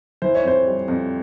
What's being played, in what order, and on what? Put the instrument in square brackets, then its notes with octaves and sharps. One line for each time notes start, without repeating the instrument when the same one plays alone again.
[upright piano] E3 C5
C#5
F2 C5
G3
F2